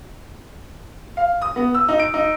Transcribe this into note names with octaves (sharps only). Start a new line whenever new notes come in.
F5
D#6
B3
E6
D#4
D7
D#4